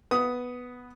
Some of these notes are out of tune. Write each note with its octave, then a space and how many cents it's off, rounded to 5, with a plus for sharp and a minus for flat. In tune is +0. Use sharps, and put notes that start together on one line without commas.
B3 +0 D#6 +5